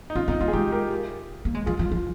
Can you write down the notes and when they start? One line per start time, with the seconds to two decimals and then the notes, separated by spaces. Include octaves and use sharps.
0.10 D#4
0.15 C#4 F4
0.28 C4 D#4
0.41 A#3 F4
0.48 G#4
0.53 G#3 D#4 G4
0.72 G4 A#4
1.45 A#3
1.54 G#3
1.66 F3 F4 G#4
1.79 F3
1.86 F4
1.91 F3